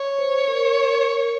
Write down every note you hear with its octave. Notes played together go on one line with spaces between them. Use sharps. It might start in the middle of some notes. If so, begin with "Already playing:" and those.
Already playing: C#5
C5
A#4